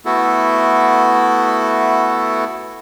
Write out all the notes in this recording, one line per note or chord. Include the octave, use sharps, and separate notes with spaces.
A3 B3 E4 F#4 A4